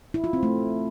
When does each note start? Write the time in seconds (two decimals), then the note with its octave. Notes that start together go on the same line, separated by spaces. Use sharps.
0.14 E4
0.24 F4
0.33 C4
0.43 A3